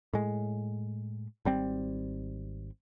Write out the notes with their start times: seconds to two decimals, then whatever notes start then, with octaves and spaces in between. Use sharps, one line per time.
0.13 A2 G#3
1.45 G#1 G3 C4